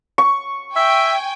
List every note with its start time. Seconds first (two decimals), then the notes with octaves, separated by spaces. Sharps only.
0.18 C#6
0.76 E5 G5 G#5